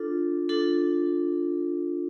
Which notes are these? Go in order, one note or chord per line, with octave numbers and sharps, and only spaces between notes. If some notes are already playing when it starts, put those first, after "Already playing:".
Already playing: D4 F4 A4
D4 F4 A4